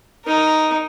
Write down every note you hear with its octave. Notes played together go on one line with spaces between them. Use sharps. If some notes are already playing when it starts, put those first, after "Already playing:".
D#4 A#4